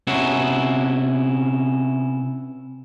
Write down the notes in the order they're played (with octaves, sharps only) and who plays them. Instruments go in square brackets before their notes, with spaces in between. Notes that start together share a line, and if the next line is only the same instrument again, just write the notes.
[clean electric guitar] C3 B3 C#4 E4 F#4